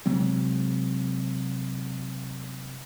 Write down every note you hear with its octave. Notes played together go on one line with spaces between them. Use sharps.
C3 F#3 G#3 C4